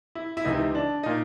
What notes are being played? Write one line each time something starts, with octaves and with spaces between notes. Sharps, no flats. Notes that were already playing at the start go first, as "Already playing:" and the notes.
E4
E4
C#2 C3 E3 D#4
D4
A#2 D#4